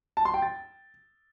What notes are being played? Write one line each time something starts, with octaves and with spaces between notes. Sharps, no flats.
A5
C6
G5
A6